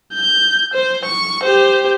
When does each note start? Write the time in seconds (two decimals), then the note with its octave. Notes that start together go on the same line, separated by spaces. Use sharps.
0.14 G6
0.74 C5
1.05 C#6
1.44 G4 C5